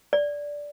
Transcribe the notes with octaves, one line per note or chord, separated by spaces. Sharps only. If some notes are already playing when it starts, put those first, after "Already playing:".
D5